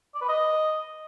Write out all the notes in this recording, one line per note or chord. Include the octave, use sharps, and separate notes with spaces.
D5
B4
D#5